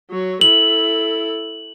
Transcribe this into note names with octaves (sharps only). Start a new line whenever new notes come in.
F#3 C#5
E4 A4 F#7